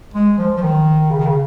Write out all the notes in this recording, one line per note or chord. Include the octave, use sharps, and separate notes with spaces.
G#3
F3
F3
D#3
C#3
D#3
C#3